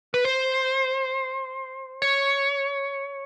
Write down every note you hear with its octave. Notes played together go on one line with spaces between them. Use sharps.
B4
C5
C#5